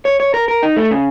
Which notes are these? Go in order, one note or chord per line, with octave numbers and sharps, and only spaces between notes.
C#5
C#5
A#4
A#4
D#4
A3
C#3